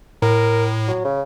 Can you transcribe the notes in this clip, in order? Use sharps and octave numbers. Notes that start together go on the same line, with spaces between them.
A2 A#4
F#3
C#3